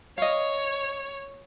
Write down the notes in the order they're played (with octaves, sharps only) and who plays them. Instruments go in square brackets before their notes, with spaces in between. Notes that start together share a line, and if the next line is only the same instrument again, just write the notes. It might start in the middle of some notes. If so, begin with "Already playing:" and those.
[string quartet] C#5 [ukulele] D#5 F5